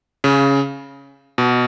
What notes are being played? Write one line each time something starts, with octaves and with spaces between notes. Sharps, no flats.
C#3
B2